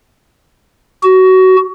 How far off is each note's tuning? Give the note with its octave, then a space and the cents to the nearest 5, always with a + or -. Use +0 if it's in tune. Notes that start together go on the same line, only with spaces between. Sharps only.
F#4 +20